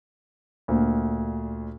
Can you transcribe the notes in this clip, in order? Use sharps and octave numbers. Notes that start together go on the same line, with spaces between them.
D2 A#2